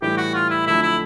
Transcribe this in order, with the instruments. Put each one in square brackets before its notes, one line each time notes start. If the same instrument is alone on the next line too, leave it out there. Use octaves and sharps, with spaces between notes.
[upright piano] A2 E3 G3 [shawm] G4
[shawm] F#4
F4
E4
[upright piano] F2 D3 F#3 A3 [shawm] E4
[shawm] E4